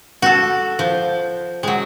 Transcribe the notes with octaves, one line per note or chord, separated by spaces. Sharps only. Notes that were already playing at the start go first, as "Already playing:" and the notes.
F#4 A4
F3
F#3 G#3